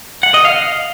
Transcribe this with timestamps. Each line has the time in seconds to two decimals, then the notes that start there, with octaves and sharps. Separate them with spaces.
0.23 F#5
0.34 D#5
0.45 F5